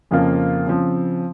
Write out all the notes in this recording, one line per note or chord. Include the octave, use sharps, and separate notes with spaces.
F2 C#3 F3 A#3 F4
C#3 F3 C4